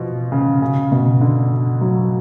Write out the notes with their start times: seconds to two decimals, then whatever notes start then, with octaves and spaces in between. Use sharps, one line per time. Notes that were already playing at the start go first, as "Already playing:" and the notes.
Already playing: B2 F3
0.32 C#3
0.62 C#3
0.92 B2
1.21 D3
1.81 F#3